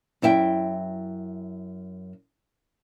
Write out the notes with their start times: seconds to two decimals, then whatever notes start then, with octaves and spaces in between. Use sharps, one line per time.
0.22 F#2 E4 E5 G5